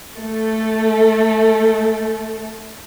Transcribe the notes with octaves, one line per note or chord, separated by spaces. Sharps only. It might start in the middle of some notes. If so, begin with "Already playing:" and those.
A3 A4